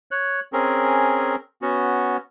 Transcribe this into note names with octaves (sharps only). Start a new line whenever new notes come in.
C#5 F#6
C4 C#4 G#4 A#4
B3 C#4 F#4